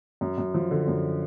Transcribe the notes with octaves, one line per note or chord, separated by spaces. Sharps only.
F#2
F#2
F3
D3
F#2